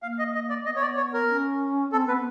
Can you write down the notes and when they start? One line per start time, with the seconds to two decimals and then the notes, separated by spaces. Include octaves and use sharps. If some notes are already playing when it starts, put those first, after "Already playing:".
0.02 A#3 F5
0.19 D#5
0.35 D#5
0.49 D5
0.66 B3 D#5
0.76 C#5
0.82 D5
0.97 C#5
1.13 A#4
1.29 C#4
1.92 C4 A4
2.07 B3 B4